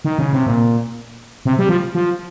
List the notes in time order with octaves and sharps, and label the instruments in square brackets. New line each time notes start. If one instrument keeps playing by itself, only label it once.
[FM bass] D#3
C#3
C3
A#2
C3
G3
F3
F3